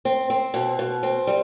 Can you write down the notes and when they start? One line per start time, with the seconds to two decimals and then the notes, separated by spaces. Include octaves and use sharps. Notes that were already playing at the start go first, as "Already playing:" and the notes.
0.05 C4
0.30 C4
0.54 B2
0.79 B2
1.03 C4
1.27 G3